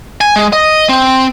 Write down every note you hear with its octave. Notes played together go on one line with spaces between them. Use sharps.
G#5
G#3
D#5
C4